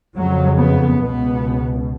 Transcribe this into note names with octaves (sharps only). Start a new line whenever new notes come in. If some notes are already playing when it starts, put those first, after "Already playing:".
F2 C#3 F#3
B3
C#2 B2 B3